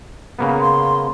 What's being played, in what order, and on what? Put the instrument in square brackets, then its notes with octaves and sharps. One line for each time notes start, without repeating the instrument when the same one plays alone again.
[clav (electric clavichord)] C#3 A#3 B3
[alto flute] C6